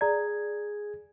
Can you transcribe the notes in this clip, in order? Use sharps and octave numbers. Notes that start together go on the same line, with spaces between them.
G#4 D5 A#5 G#6